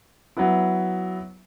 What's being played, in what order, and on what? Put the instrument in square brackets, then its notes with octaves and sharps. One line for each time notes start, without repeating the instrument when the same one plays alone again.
[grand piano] F#3 B3 E4